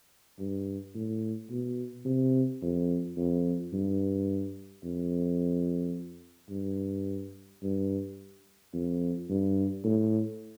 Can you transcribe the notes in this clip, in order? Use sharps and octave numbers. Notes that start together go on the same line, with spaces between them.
G2
A2
B2
C3
F2
F2
G2
F2
G2
G2
F2
G2
A2